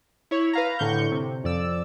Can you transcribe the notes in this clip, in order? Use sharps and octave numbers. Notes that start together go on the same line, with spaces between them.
E4 C#5
B4 F5 A#5
A2 D3 C#6 G6
C3
F2 D5 E6